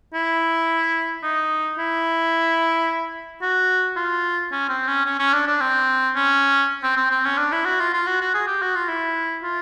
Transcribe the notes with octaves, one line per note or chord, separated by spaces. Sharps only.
E4
D#4
E4
F#4
F4
C#4
C4
C#4
C#4
C#4
D4
D4
C4
C#4
C4
C4
C4
C#4
D4
E4
F#4
F4
F4
F#4
F#4
G#4
G4
F#4
F4
E4
F4